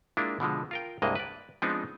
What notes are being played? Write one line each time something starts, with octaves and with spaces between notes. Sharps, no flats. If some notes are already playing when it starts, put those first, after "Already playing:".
G#3 A#3 D4 E4 F4
B2 D3 F3 G#3
F4 A#4 G5
C2 G2 G#3 A#3 D#5
B4 D5
F3 G#3 B3 C4 D4 D#4